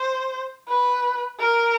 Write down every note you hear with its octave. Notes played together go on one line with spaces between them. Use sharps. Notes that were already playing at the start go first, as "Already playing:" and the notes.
Already playing: C5
B4
A#4